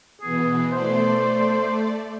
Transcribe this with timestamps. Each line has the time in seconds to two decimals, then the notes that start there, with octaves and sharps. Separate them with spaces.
0.21 B2 E3 B3 G#4
0.72 A3 C5 D5